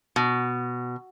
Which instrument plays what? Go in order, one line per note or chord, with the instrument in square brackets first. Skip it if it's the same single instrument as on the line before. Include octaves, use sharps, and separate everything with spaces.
[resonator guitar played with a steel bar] B2